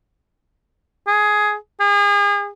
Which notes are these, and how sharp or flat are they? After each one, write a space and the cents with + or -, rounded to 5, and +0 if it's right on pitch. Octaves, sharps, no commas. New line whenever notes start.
G#4 +15
G#4 -35